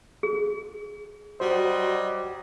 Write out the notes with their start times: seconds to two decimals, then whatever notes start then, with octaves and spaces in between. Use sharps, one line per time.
0.23 G#4
1.40 F#3 G3 F#4 C5 D#5